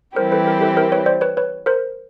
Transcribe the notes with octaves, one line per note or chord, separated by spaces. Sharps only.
E3 G3 C4 E4 G4 A#4 C5
A4 B4
A#4
A4 B4
A#4 C5
B4 C#5
C5 D5
B4 C#5
B4 C#5
A#4 C5